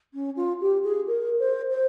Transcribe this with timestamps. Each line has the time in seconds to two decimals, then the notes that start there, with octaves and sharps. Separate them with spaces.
0.14 C#4
0.37 F4
0.61 G4
0.84 G#4
1.07 A#4
1.39 C5
1.71 C5